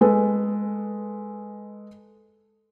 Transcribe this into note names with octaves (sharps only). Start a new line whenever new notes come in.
G#3 A4 B4